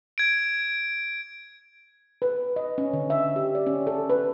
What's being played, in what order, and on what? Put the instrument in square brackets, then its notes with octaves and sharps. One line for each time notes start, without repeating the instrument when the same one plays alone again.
[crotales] G#6 D7
[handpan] B4
D#5
C#4
D3
E5
G4
D5
C#4
A4
B4